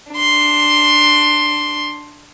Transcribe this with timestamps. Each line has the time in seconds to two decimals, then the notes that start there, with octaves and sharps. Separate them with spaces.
0.12 D4 C6